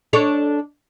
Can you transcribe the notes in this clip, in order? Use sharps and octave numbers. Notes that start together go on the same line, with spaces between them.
D4 A4 C#5